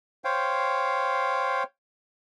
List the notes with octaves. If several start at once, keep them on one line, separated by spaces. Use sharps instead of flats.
C5 C#5 F5 G5